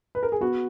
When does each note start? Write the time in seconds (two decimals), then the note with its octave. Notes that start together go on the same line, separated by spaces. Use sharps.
0.15 B4
0.23 A#4
0.32 G#4
0.41 B3 F#4